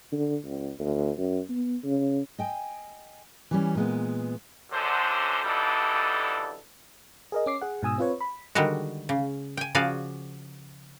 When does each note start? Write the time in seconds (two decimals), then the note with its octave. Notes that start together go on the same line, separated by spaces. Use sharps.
0.12 D3
0.44 C#2
0.80 D2
1.18 F#2
1.49 B3
1.84 C#3
2.39 D#5 G5 G#5
3.51 E3 G3 C#4
3.75 A#2 G#3 B3
4.72 F#2 D3 C5
5.44 F#2 D3 E3 G3 D#4 A4
7.32 G#4 A#4 D#5
7.46 C#4 D6 C7
7.62 G#4 F#5
7.82 G#2 B2 G#5 D#6 E6
7.98 C4 F4 B4 C#5
8.21 B5
8.55 D3 D#3 G3 G#3 F#4
9.09 C#3
9.57 G5 G#5
9.75 C#3 F3 F#4 D5 F5 G#5